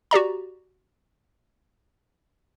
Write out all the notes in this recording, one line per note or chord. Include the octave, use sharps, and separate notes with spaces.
F#4 G4 D5 A#5